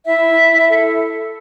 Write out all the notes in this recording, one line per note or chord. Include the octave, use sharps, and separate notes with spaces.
E4 E5
E4
E4
A4